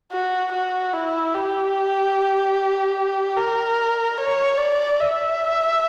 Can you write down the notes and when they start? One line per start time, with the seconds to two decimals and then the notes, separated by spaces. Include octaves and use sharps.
0.12 F#4
0.52 F#4
0.93 E4
1.34 G4
3.37 A#4
4.18 C#5
4.58 D5
4.99 E5